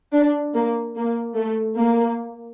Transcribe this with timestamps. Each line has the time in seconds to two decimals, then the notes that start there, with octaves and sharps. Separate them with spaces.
0.13 D4
0.54 A#3
0.95 A#3
1.36 A3
1.77 A#3